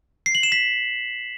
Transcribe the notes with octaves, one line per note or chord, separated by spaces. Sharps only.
C7
F#7
E7
B6